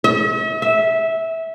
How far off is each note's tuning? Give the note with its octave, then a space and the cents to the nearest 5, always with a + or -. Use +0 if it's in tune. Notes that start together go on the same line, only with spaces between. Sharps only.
E5 -45
E5 -15